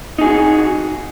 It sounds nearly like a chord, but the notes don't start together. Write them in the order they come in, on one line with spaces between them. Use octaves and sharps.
D#4 G#4 F#4